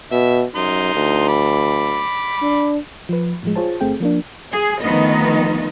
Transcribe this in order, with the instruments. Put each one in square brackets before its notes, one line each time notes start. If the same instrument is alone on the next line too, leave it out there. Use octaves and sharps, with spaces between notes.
[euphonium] B2 [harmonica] E5
[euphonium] F#2 [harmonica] D#4 C6
[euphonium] D2
[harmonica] B5 D6
[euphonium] D4
[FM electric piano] F3 B4
A2 F3 G#3
F4 G#4 C5 C#5 A5
G1 A3 C4 G#4 G5
F3 A#3 D4
[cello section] G#4
D2 D#3 F3 B3 D#5